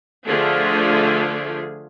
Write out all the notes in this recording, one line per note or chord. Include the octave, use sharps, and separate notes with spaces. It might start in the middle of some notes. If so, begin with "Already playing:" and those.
D3 F3 A3 F4 G#4